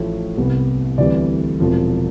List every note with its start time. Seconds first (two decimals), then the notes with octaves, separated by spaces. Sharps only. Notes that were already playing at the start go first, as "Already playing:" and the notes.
Already playing: A1 A2 F3 A3
0.37 C2 C3 G3 B3
0.98 D2 C3 E3 G3 D5
1.60 E1 E2 C3 F3